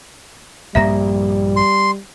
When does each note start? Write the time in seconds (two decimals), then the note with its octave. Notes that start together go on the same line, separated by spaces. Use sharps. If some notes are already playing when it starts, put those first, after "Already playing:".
0.75 A#1 G2 G3 A#3 E5 A#5 A#6
1.56 C6